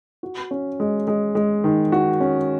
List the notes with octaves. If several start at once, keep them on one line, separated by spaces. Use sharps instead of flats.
F#4
C#4
G#3
G#3
G#3
D#3
F#4
C#4